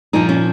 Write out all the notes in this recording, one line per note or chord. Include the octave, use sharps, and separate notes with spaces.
A#2 F3 D#4
C#4